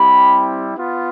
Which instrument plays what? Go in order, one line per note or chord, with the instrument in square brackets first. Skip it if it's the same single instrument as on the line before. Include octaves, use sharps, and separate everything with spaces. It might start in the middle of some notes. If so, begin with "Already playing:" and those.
Already playing: [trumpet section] G3 C4 E4 G4 B5
B3 F4